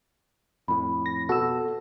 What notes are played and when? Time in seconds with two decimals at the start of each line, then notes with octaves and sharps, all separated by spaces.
0.68 F2 A2 B5
1.06 A#6
1.29 B2 F#4 A4 E6